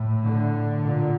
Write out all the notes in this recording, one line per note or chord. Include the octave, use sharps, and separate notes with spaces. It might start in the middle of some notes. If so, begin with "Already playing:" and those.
Already playing: A2
D3
A#2